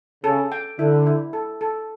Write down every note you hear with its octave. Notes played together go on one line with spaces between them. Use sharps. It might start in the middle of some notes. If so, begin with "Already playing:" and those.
C#3 A4
G5
D3 E4
E4
A4
A4